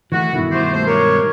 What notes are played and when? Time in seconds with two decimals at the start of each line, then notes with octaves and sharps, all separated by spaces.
0.12 E3 G#3 A3 E4 F#4
0.33 G2 B2 D#3 E4
0.51 A3 G4 C5
0.74 A3 C5
0.87 G#3 G4 A#4 C#5